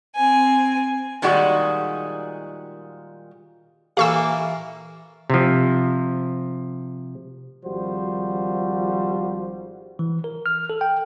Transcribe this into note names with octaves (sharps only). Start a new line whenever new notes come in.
C4 G#5
A#2 D#3 G3 G#3 F#4
A#2 E3 A#3 G4 A4 F5 C#6 E6
C3 F3
G#1 F3 G3 F#4 C5
E3
A#4
F6
A4
G5